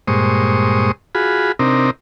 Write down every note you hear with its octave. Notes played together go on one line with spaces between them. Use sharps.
G2 A#2 G#3 C5 C#6 D#6
F4 F#4 G#4 B5
C3 C4 D4 D#4 A#4